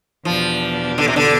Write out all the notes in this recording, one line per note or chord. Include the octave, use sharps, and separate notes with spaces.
E2 B2 F3 B3 D4 G4
D3
C3
D3